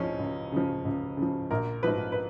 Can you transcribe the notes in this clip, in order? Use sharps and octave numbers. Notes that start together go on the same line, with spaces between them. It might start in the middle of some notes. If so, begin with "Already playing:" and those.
Already playing: C#2 C#3 F3 C#4 D#4
C#2
C#3 F3
C#2
C#3 F3
A#1 A#4
G#2 F3 B4
B4